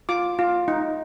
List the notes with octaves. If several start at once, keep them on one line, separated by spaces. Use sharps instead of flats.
F4 D6
F4
D#4